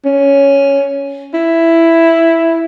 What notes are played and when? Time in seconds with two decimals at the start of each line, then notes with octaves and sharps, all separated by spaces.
0.05 C#4
1.34 E4